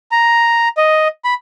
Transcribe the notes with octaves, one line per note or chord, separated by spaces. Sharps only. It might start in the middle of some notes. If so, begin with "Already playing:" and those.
A#5
D#5
B5